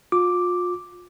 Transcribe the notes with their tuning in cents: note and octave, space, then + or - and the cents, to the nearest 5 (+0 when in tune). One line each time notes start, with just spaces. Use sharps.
F4 +35 D6 +0